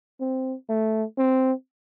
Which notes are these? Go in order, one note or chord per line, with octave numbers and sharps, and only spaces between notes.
C4
A3
C4